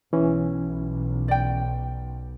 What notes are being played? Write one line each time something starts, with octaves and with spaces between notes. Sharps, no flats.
B1 E3 C#4
D5 G5